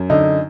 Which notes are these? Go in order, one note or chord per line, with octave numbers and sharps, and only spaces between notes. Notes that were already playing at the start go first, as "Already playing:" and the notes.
Already playing: F#2
D3 D#4